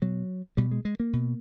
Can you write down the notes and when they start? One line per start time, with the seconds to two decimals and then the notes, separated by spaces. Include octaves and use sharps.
0.02 B2 F#3
0.57 B2 G3
0.71 G#3
0.85 G#3
1.00 A#3
1.13 B2